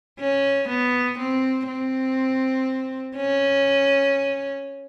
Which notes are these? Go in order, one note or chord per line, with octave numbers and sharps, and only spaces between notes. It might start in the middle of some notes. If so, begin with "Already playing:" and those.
C#4
B3
C4
C4
C#4